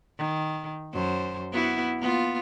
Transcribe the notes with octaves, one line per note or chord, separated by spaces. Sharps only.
D#3
F#2 C5
B3 E4 F#4
A#3 B3 F4